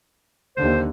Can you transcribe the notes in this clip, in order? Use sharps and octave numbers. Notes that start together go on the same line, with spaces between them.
D#2 D3 C5